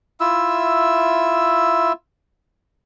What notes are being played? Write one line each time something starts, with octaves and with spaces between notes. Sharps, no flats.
E4 F4 E5 E6